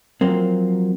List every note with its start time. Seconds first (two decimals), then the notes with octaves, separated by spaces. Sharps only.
0.21 F3 F#3 A#3 C4